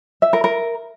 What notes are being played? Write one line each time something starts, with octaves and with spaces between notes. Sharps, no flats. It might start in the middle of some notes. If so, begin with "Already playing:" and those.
E5
A#4
A#4